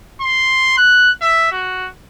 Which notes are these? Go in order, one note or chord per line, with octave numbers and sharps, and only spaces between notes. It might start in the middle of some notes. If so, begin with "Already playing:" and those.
C6
F#6
E5
F#4